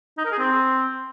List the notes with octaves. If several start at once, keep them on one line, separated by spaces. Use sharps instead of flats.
D#4
A#4
G#4
C4